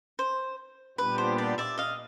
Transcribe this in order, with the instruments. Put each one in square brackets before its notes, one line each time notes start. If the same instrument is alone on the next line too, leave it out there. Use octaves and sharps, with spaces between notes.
[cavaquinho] C5
[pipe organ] A#2 G3 B3 D4 G4 [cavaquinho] B4
[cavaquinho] C5
D5
D5 E5
D#5 F5